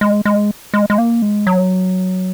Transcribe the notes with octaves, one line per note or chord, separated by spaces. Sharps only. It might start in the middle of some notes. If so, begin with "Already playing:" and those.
G#3
G#3
G#3
G#3
A#3
G#3
F#3